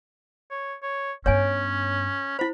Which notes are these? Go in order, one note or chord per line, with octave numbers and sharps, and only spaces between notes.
C#5
C#5
G2 B3 C#4 C#5 G#5
E4 C5 B5